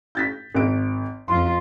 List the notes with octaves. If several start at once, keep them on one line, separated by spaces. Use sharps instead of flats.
G6 A6 B6
G#1 D7
F2 F4 C6